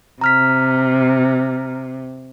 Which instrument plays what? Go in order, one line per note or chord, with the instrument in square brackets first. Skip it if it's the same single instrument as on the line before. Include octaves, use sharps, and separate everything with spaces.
[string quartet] C3 [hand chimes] A#5 F6 B6